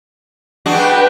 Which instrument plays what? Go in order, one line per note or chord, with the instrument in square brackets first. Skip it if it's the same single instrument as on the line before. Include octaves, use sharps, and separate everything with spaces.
[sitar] G#3 D4 F#4 [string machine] B4 G5